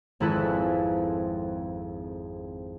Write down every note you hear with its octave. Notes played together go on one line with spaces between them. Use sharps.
G#1 F2 E4 A4 B4 G#5